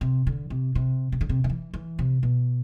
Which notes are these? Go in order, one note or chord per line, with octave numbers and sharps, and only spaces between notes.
C3
D3
C3
C3
C3
D3
C3
D3
E3
E3
C3
B2